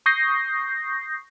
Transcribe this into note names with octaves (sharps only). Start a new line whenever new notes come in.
C#6 D#6 G6 A#6 C7